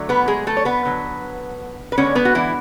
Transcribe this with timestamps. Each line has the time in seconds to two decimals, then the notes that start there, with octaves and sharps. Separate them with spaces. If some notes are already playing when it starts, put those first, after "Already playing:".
Already playing: D3 F#3 A3
0.09 B3 B4
0.28 G#3 G#4
0.47 A3 A4
0.57 C#5
0.65 B3 B4
0.85 D3 F#3 B3
1.92 B4
1.98 D3 G#3 B3 C#4 C#5
2.15 B3 B4
2.25 F#4
2.35 E3 E4